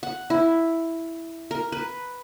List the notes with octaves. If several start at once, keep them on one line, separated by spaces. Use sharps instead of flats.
F#5
E4
A#4
B4